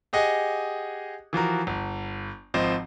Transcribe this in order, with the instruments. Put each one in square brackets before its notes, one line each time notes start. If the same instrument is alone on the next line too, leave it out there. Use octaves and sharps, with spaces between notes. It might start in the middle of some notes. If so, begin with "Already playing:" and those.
[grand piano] G4 G#4 D#5 F#5 G#5
E3 F3 F#4 A#4
G1
G#1 F3 C4 D#5